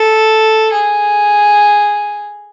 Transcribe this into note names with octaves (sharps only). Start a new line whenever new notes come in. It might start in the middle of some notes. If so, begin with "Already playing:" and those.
Already playing: A4
G#4